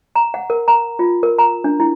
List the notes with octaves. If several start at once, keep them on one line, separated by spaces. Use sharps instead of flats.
A#5
F#5
A#4
A#5
F4
A#4
A#5
D4
E4